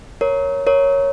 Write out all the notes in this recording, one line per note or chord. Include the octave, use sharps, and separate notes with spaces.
A#4 C#5
A#4 C#5